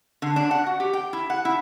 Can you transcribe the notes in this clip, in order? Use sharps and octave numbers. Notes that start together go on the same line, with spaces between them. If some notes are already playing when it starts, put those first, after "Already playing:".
D3
D4
F#5
F#4
G4
G5
E4
F#5
E4